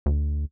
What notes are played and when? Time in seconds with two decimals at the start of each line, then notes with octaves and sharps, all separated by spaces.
0.06 D2